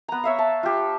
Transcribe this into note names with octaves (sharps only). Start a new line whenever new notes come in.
B3 A#5
C#5 E5 F5
A5
F4 G4